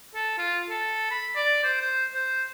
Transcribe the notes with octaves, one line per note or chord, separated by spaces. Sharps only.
A4
F4
A4
B5
D5
C5
C5
C5